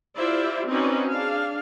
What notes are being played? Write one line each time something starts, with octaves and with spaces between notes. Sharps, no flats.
E4 F4 G4 C5 D5 E5
C4 C#4 D#4 F#4 B4 D5
D4 G#4 F5